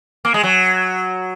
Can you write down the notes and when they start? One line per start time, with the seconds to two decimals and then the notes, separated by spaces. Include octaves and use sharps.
0.25 A#3
0.34 G#3
0.43 F#3